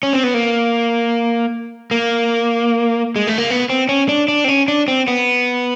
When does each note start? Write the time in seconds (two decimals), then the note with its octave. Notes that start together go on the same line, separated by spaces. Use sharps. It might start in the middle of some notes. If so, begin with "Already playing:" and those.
0.03 C#4
0.13 C4
0.23 B3
0.34 A#3
1.91 A#3
3.16 G#3
3.27 A3
3.38 A#3
3.50 B3
3.70 C4
3.89 C#4
4.09 D4
4.28 D4
4.44 C4
4.48 C#4
4.68 D4
4.88 C4
5.08 B3